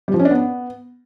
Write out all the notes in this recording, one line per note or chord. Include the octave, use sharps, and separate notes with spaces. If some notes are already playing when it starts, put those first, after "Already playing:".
G3
F3
C#4
D4
B3